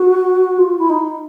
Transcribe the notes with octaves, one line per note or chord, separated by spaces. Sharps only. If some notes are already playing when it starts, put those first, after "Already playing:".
Already playing: F#4
F4
E4
D#4